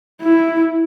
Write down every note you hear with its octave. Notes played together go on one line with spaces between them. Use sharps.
E4